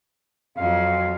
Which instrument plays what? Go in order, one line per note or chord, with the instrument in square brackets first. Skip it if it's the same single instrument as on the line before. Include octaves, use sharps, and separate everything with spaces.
[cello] F2 F#3 [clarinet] F5